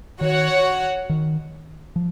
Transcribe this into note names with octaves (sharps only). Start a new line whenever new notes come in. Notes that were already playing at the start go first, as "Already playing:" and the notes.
D#3 F#4 C#5 F#5
D#3
F3